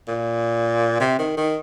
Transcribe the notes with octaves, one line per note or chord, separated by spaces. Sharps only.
A#2
C3
D#3
D#3